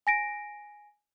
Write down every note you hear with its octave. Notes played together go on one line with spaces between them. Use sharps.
G#5 A#6 D7